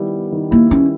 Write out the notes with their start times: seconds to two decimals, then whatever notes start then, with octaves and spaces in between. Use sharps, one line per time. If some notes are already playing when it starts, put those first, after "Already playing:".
Already playing: D#3 G3 B3 E4
0.13 B3
0.32 D#3
0.51 A#3 E4
0.71 G3 C#4